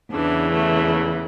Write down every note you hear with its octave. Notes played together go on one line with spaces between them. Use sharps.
E2 C#3 E3 D4
A3